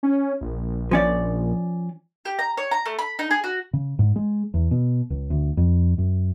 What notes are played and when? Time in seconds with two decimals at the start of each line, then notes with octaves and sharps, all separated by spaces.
0.03 C#4
0.41 A#1
0.91 F3 C#4 D5
2.25 G4
2.39 A#5
2.57 C#5
2.71 A#5
2.86 A3
2.99 B5
3.19 D#4
3.31 G#4
3.44 F#4
3.73 C#3
3.99 G#2
4.16 G#3
4.54 E2
4.71 B2
5.10 C#2
5.30 D2
5.57 F2
5.98 F#2